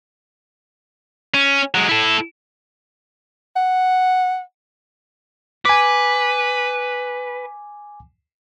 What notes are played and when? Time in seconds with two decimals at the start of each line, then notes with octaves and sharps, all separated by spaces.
1.34 C#4
1.75 F#3 G#3
1.89 E4 A4
3.56 F#5
5.65 B4 G#5 D6